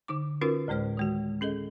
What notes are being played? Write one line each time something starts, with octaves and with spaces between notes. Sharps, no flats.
D3 D#4 D6
C#4 D#4 F4 F#4 A#4 B4
D2 A2 G#3 C5 F6
D#3 G#3 F#4
C#4 G#4 A4 D#5